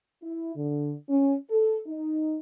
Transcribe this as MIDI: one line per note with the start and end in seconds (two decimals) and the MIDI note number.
0.23 0.53 64
0.56 0.93 50
1.09 1.35 61
1.50 1.80 69
1.87 2.38 63